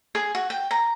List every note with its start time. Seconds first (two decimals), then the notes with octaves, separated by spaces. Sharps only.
0.15 G#4
0.35 F#4
0.50 G5
0.71 A#5